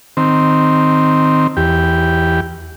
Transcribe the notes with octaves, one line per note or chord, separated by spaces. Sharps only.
D#3 C4
E2 G4